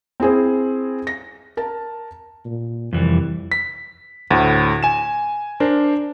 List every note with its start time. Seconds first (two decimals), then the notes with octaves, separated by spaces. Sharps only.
0.20 C4 E4 G#4 C5
1.07 A#6
1.57 A#4 A5
2.45 A#2
2.93 C2 F2 E3 G3
3.52 B6
4.31 D2 A2
4.83 G#5 E7
5.60 D4 A#4 C5